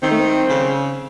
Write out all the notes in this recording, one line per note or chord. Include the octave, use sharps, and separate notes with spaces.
D#3 C4
A3
C4
C#3